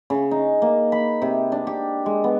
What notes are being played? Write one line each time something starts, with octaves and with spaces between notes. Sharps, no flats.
C#3
D#4
A#3
B5
C3
D4
G4
G#3
B3